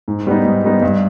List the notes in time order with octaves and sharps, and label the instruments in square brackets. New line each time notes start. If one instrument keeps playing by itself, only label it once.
[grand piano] G#2
G3 B3 D#4
G#2
G3 B3 D#4
G2